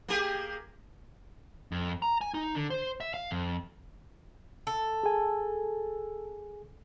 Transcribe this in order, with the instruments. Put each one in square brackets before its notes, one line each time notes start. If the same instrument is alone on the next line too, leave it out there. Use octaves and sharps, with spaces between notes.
[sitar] A#3 G4 G#4
[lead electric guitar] F2
A#5
G#5
D#4
D3
C5
E5
F5
F2
[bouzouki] A4
[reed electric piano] G#4 G#5